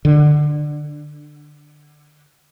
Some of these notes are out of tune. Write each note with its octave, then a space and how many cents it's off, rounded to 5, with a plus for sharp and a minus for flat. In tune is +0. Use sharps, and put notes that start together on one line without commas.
D3 +15